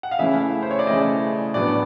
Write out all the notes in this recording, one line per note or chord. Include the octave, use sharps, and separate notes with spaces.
F#5
F5
C#3 E3 A3 C#4 E4 E5
C5
C#5
D5
C#3 E3 A3 C#4 E4 D#5
A2 F#3 B3 D4 D5